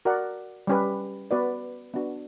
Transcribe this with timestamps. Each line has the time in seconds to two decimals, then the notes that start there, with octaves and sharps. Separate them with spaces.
0.05 F#4 A#4 D5 F#5
0.67 G3 C#4 G4 B4
1.31 B3 F#4 B4 D5
1.94 B3 D4 F#4